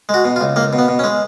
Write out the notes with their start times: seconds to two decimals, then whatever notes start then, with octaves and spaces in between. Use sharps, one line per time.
0.09 G#3 F#4
0.25 B2
0.36 F4
0.41 C#2
0.56 C#2 A#3
0.73 B2
0.78 B3
0.88 B2
0.99 C#4
1.04 G#3